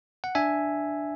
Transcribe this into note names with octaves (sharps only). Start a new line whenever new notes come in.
F#5
D4 E5 G#5